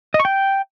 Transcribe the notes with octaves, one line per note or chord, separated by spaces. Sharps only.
D#5
C#6
G5